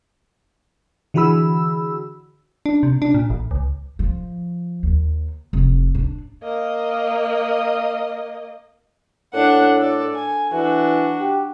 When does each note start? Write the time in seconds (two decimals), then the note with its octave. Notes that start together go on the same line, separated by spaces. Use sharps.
1.14 D3 E3 F#4 G#4 B5 E6
2.66 D4
2.83 C3
3.02 D4
3.14 A#2
3.30 A1
3.51 C#2
3.99 F3
4.83 D#2
5.53 F1
5.95 D4
6.43 A#3 D#5
9.34 A2 D4 F#5
9.77 A4 D5
10.15 G#5
10.52 E3 D4 F#4
11.21 G4